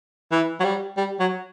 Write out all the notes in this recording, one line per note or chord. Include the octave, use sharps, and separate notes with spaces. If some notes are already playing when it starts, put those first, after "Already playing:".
E3
F#3
G3
G3
F#3